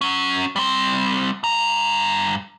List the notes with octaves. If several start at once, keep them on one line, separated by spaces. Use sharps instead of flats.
F#3 C#4
G3 C4
G2 A#5